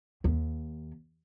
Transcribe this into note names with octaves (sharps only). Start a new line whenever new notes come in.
D#2